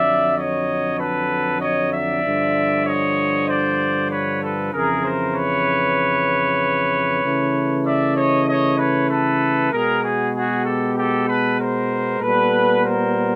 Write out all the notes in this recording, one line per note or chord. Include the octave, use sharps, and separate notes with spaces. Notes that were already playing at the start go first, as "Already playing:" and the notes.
Already playing: F2 D3 F#3 D5 E5
C#5 D#5
A4 B4
C#5 D#5
D5 E5
G2 D3 F3
C#5 D#5
C5 D5
B4 C#5
A4 B4
F2 C#3 E3 G#4 A#4
A#4 C5
B4 C#5
C#3 E3 A3
D5 E5
C#5 D#5
C#5 D#5
B4 C#5
A4 B4
B2 G#3 B3 G#4 A#4
F#4 G#4
F#4 G#4
G4 A4
G4 A4
A4 B4
A#4 C5
A#2 G3 B3 A4 B4
A#4 C5